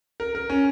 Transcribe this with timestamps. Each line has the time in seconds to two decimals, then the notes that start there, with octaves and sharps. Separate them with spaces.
0.20 A#4
0.35 A#4
0.50 C#4